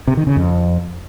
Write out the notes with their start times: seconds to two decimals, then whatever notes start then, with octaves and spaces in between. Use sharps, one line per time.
0.07 C3
0.17 D#3
0.27 C#3
0.36 F2